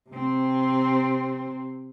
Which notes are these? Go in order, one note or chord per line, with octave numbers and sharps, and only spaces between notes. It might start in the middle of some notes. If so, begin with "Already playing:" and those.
C3 C4